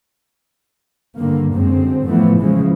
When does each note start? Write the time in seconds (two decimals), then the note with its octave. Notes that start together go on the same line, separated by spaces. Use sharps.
1.18 G2 D3 D#3 A#3
1.56 F#2 D3 G#3 C4
2.05 A2 E3 F3 A3 B3
2.40 A1 C#3 E3 F3 G#3